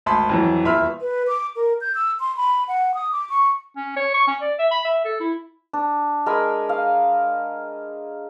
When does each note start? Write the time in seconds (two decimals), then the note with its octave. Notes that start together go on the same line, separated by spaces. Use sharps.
0.06 G#1 D2 A5 B5 C6
0.30 F2 E3 F#3
0.64 D#1 E2 E5 B5 C6 F6
1.01 B4
1.28 D6
1.56 A#4
1.81 G6
1.95 E6
2.20 C6
2.37 B5
2.68 F#5
2.95 D#6
3.12 D6
3.30 C#6
3.77 C#4
3.96 C#5
4.14 C#6
4.27 C#4
4.41 D5
4.59 E5
4.71 B5
4.85 E5
5.05 A4
5.20 E4
5.73 D4
6.26 G#3 A#4 G#5 B5
6.69 F5